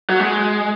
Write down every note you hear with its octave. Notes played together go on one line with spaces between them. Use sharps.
F#3
G#3